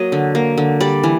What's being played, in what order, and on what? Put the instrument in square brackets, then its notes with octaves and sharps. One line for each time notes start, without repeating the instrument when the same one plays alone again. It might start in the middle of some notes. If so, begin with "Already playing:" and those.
Already playing: [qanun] F#3 A#3 D#5
D3
A#3
D3
G3 D5
E3